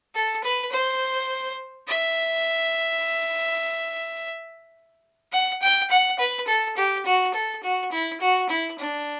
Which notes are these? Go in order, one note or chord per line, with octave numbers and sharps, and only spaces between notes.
A4
B4
C5
E5
F#5
G5
F#5
B4
A4
G4
F#4
A4
F#4
E4
F#4
E4
D4